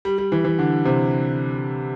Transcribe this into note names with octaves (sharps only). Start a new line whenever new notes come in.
G3
G3
E3
E3
D3
C3